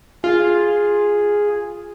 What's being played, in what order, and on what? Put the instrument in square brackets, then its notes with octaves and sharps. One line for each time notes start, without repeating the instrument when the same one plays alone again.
[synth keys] F4 [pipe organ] G#4